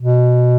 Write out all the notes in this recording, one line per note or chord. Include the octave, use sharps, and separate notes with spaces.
B2